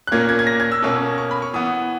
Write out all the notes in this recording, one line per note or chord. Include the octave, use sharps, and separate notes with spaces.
F#6
A#2 A#3 C#4 G#6
G#6
G#6
A#6
G#6
E6
B2 A#3 C#4 E6
C#6
B5
C#6
E3 B3 D#6